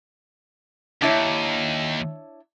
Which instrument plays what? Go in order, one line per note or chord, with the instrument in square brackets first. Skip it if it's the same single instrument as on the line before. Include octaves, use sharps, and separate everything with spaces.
[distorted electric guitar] D#2 [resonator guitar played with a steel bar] D4 E4 C#5